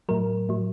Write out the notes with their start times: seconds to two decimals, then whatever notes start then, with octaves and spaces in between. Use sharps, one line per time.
0.09 A2 F#3 A#4
0.49 A2 F#3